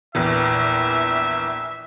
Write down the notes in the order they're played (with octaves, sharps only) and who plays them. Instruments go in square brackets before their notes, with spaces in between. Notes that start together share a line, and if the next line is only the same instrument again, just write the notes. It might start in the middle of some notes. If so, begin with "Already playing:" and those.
[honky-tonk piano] A#1 E2 E3 [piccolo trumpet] E5